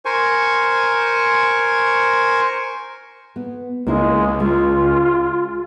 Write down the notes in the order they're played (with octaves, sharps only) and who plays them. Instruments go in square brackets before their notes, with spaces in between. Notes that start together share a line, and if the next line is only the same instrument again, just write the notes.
[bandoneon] A#4 C5 G#5 C#6
[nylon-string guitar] B3
[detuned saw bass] C#2 [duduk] G#3 [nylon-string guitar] A#3 E4 C5
[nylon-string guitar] G#3 [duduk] F4